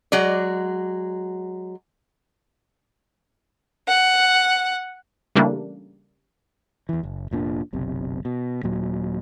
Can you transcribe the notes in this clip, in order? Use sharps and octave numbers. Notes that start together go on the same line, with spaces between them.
F#3 G#3 D5
F#5
C#3 E3 G3 A3 A#3 D4
E2 E3
F#1
F1 A#2 C#4 D4
F#1 B1 C3
B2
D#1 A#2 F#3